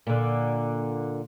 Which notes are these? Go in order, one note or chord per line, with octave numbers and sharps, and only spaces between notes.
A#2 D3